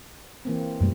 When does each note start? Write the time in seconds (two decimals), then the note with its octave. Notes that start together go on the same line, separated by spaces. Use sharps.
0.45 E3 A#3 C4
0.80 F#2 B2 G3 A3